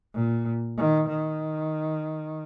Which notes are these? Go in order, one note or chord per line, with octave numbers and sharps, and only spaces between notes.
A#2
D#3
D#3